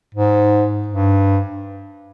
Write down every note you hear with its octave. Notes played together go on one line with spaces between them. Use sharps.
G#2
G2